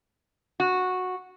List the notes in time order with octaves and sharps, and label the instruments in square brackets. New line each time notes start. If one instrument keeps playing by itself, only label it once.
[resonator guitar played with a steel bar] F#4